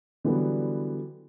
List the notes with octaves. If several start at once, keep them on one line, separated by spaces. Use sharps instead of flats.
D3 E3 F#3 G3 B3